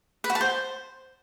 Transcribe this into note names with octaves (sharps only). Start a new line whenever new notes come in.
B4
F#4
A5
C5